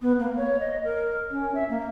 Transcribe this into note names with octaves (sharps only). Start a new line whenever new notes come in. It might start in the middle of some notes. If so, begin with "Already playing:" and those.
B3
A#3
C#5
D#5
A#4
C#4
E5
A#3